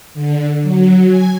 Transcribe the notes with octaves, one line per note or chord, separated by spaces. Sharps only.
D3
F#3
G#5